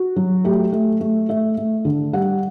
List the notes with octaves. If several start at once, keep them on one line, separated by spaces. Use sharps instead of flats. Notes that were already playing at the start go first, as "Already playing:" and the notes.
Already playing: F#4
F#3
A3 G4
A3
A3
A3 E5
A3
D3
G3 F#5